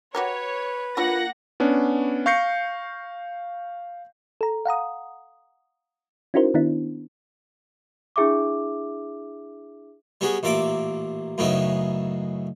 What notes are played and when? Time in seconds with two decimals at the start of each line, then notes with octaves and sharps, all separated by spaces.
0.15 F#4 G4 A#4 B4 C#5
0.97 A#3 D4 E4 F4 C#5 F#5 A#6
1.60 B3 C#4 D4
2.26 F5 C#6 G6 A#6 C7 C#7
4.41 A4 A#5
4.65 F5 F#5 A#5 D#6
6.34 C#4 D#4 E4 F#4 A#4 C5
6.54 D#3 B3 D4 E4
8.16 D4 E4 G#4 E5 D6
10.21 G3 B3 C#4 F#4 G#4
10.43 A1 A#2 A#3 D5 E5 D6
11.38 F#2 A2 C#3 B3 D#4 E4